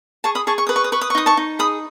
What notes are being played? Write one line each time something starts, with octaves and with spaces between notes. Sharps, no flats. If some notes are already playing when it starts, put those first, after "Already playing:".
G#4 A5 C#6
B5 D#6
G#4 A5 C#6
C#6
B4 D#6
C#6
D#6
B4 C#6
D#6
C#6
D#4 D#6
A5 C#6
D#4
G#4 B5 D#6